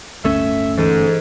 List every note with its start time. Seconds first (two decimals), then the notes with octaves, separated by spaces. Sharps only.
0.24 D1 G1 A3 C#4 E5
0.78 G#2 E3 A4